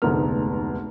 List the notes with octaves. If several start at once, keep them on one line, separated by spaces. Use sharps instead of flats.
F1 D2 G#2 B3 F6